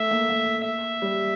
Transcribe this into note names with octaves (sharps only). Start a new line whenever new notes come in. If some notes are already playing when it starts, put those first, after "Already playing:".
Already playing: A3 E5
A#3
A#3
E5
G3